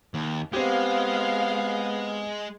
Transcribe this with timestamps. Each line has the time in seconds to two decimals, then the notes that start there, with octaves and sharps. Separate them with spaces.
0.14 D#2
0.53 G#3 B3 C4 G4 F5